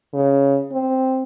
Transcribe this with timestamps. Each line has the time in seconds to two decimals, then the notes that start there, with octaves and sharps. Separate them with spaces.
0.13 C#3
0.72 C4